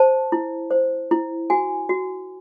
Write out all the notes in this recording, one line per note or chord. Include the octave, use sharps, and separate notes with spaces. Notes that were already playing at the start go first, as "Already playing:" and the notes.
Already playing: C5 A5
E4
C5
E4
F#4 G#5
F#4